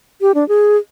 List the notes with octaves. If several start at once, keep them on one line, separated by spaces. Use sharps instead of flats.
G4
D4
G#4